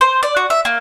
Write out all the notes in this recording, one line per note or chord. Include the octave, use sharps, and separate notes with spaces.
C5
D5
F#4
E5
A#3